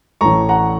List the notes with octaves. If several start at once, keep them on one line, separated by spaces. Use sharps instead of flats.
A1 A2 A3 A#5 C#6
F#5 A#5